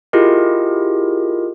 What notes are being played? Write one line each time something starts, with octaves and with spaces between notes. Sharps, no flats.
E4 F4 G4 G#4 A#4 D#5